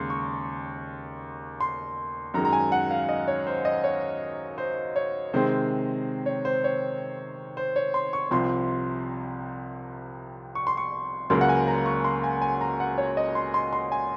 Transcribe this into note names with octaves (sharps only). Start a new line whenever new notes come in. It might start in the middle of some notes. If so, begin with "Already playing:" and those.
Already playing: D#2 C#3 G#3 C6
C#6
C6
F#2 D#3 G#3 A#5
A#5
G#5
F#5
F5
D#5
C#5
C5
D#5
C#5
C5
C#5
C3 D#3 G#3 C4 C5
C#5
C5
C#5
C5
C#5
C6
C#6
C2 C3 F3 C6
C#6
C6
C#6
C#2 C#3 F#3 A#3 C6
F#5
G#5
A#5
C#6
C6
G#5
G#5
A#5
F#5
C#5
D#5
C6
C6
C6
G#5